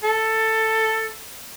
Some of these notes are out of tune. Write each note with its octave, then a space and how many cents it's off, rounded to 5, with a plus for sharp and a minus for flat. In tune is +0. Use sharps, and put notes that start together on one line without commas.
A4 +10